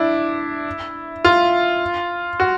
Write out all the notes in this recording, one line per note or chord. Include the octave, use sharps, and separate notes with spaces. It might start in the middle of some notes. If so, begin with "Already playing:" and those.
Already playing: D4 E4
F4
F#4